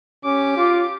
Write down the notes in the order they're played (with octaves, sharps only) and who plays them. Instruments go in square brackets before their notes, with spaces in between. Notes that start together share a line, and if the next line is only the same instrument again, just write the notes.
[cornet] C#4 [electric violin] G4 D6
[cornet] F4